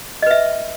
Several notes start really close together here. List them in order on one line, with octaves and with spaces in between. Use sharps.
D#5 B4 E5